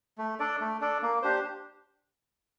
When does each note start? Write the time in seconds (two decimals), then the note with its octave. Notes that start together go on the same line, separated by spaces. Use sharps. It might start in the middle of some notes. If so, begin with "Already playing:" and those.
0.18 A3
0.40 D4 A4 D5
0.61 A3
0.81 D4 A4 D5
1.02 A#3
1.22 D4 G4 C5